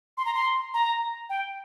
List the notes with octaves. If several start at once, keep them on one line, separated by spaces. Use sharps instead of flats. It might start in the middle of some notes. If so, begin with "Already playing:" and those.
C6
A#5
C6
A#5
G5